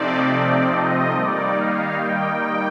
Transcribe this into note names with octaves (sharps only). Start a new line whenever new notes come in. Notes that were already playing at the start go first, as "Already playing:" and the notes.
Already playing: C3 F3 A3 C4 D#4 D5
D#5
D#3 G3 A#3 D#4 D5
F5
G5
G5